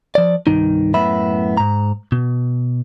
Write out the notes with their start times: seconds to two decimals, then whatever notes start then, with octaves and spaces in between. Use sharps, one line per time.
0.15 F3 D5
0.47 C2 G2 D#3 D#4
0.94 F#2 A2 B3 E5 B5
1.57 G#2 A#5
2.12 B2